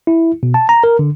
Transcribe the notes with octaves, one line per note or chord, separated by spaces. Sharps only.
E4
B2
A5
A#5
A#4
D3